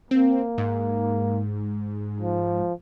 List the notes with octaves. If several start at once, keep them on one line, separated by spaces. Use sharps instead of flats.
A#3 C4
G#2
F3